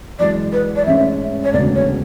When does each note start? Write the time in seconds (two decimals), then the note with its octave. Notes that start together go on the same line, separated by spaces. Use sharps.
0.19 F#2 E3 G#3 D5
0.53 B4
0.76 D5
0.86 A1 G#2 G#3 C#4 E5
1.44 C#5
1.53 E1 D2 C#3 D5
1.75 C#5